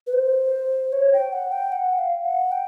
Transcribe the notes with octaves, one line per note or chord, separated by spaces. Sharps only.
B4
C5
C#5
G5
F#5
G5
F#5
F5
F#5
G5